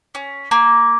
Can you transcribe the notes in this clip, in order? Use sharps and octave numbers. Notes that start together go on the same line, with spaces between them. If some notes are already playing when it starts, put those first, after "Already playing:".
C#4
A#3